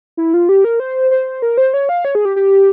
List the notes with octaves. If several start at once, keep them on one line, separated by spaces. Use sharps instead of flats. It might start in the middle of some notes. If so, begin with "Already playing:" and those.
E4
F4
G4
A#4
C5
C5
A#4
C5
C#5
F5
C#5
G#4
G4
G4